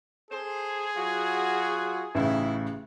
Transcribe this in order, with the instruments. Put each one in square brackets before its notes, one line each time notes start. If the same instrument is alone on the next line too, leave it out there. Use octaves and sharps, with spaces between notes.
[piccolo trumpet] G#4 [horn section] A4 C5
[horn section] F#3 F4 F#4
[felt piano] A1 A2 C#3 [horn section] D#4 E4